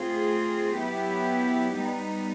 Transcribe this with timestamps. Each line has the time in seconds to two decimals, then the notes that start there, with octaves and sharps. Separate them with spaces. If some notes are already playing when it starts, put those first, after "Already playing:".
Already playing: A3 C4 F4 G#4
0.78 F#3 B3 E4 G4
1.77 G3 B3 D#4